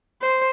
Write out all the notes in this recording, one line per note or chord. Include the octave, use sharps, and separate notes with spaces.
C5